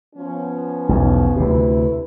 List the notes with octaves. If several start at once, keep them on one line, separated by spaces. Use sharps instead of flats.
F3 B3 C#4
B1 E2
D2 C3 E4 B4